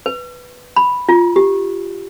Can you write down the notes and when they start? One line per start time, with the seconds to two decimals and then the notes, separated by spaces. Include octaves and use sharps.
0.06 B4
0.76 B5
1.09 F4
1.36 G4